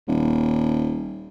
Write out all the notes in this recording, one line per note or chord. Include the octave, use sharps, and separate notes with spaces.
D#1